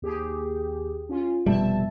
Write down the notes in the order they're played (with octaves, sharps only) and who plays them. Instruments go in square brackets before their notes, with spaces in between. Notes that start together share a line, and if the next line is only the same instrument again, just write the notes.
[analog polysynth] D#2 G4 G#4
C#4 F4
[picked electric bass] F1 B2 G3 [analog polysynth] E5 A5